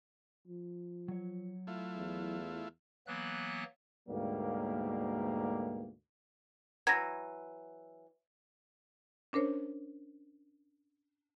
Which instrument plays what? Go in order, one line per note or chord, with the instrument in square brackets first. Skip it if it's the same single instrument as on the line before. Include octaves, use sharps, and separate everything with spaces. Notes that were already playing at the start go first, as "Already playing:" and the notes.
[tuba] F3
[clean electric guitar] F#3 C#5
[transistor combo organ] A3 E4 F4
[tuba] E2
[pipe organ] E3 F#3 A#3 B3 F#6
[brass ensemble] D2 G#2 B2 G3 A#3
[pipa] E3 F#3 [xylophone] G#6 A#6
[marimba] C#4 D4 A#4 C5 C#5